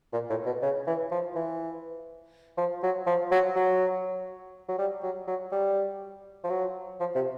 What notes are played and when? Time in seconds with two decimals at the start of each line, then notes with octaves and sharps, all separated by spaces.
0.13 A#2
0.30 A2
0.46 B2
0.62 C#3
0.87 E3
1.11 F3
1.36 E3
2.58 F3
2.83 F#3
3.07 F3
3.32 F#3
3.56 F#3
4.69 F#3
4.78 G3
5.03 F#3
5.28 F#3
5.52 G3
6.44 F3
6.50 F#3
7.00 F3
7.15 C3